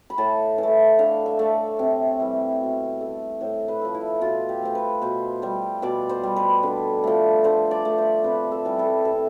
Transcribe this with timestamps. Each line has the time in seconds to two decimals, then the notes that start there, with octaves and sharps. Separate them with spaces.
0.10 B5
0.18 A2 A5
0.58 E3
0.63 A3
0.99 D3 F5
1.26 E5
1.39 A3
1.79 C3
2.20 E3 G3
2.61 B2
3.01 A3
3.41 A2 C5
3.68 B4
3.81 F3 A3
3.94 E4
4.21 B2 F4
4.49 G4
4.62 A3 C5
4.75 B4
5.02 B2 C5
5.42 G3 C5
5.82 B2 D5
6.09 C5
6.23 G3
6.36 B4
6.63 D3
7.04 F3 A3
7.44 D3 C5
7.71 D5
7.85 A3
7.98 C5
8.24 C3 B4
8.52 A4
8.65 E3 G3
8.79 A4
9.05 C3 A4